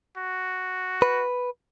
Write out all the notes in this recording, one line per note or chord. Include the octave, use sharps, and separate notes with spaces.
F#4
B4